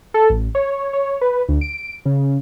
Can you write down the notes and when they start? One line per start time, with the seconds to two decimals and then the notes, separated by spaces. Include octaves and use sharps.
0.14 A4
0.30 A1
0.55 C#5
0.93 C#5
1.21 B4
1.48 D2
1.61 D7
2.05 C#3